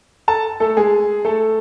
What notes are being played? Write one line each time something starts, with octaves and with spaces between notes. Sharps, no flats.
A4 A5
A3 A4
G#3 G#4
A3 A4